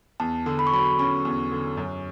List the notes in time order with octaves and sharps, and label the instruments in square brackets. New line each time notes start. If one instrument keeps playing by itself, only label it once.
[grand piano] E2 [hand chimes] A5
[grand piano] D3
[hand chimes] B5
C#6
[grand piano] F#3 [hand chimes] B5
[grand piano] C#4 [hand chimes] C#6
[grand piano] E2
D3
F#2